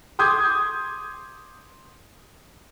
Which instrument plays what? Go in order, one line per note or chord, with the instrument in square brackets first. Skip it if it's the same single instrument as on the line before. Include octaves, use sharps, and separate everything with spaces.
[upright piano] C6 D6 D#6 G6 G#6